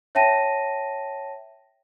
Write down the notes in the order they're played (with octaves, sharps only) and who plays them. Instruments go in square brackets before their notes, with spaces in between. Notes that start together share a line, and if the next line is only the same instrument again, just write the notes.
[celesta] C#5 E5 G5 A5 A#6 D#7